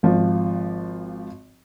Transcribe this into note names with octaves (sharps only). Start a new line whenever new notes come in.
G#1 F3